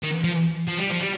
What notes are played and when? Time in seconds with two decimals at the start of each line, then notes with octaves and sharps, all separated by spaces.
0.03 D#3
0.24 F3
0.68 F3
0.78 G3
0.90 F3
1.00 G3